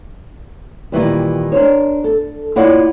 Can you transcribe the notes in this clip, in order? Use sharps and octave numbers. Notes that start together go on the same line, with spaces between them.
A#2 D#3 E3 G3
D4 A#4 C5 C#5
A4
A#3 E4 F4 C#5 D5 F#5